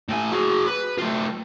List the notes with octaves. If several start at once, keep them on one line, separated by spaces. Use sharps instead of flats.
A2 G#5
F#4 G#4
B4
A3 F4